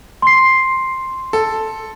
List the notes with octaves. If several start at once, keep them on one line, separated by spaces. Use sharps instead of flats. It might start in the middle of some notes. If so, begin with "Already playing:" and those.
C6 C7
A4